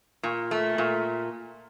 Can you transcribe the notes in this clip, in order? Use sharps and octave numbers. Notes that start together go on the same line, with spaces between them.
A#2
A3
A#2